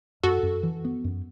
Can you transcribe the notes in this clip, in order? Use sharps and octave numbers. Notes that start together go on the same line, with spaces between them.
F#2 F#4 A4
F#2
E3
B3
F#2